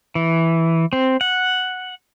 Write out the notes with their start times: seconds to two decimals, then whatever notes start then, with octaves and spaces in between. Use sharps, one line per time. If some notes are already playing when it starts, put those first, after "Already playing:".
0.15 E3
0.93 C4
1.21 F#5